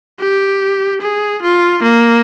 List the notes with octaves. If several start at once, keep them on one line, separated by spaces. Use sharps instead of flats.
G4
G#4
F4
A#3